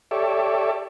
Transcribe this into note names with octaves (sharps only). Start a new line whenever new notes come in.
G4 A4 C#5 D5 E5